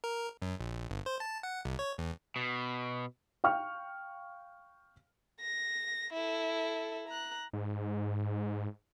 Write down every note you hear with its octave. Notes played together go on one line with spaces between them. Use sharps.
A#4
F#2
A#1
G1
C5
A5
F#5
C2
C#5
E2
B2
F5 G5 C#6 F6
A#6
E4 A4
A#5 F#6
G#2